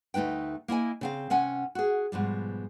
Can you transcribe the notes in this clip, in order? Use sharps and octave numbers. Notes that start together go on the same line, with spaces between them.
D2 A3 D#4 B4 G5
A#3 E4 D#5 G#5
C#3 C4 F5
C3 C#4 F#5 G#5
F#4 G#4
G#2 B2 F3 G3